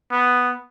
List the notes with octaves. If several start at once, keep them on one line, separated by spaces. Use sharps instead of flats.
B3